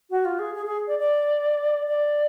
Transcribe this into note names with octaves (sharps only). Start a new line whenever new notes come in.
F#4
F4
G#4
G#4
G#4
D5
D5
D5